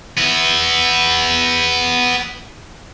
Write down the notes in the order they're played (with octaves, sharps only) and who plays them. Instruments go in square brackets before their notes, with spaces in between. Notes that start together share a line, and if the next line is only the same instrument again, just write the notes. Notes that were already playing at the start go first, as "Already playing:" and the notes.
[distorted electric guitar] B3 E4